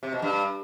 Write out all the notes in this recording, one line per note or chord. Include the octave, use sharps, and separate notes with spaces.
C3
B2
G2